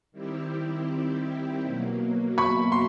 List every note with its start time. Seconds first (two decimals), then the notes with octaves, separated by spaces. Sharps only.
0.12 D#3 G3 C4 E4 G4
1.62 B2 F#3 A#3
2.38 B5 C#6
2.72 C6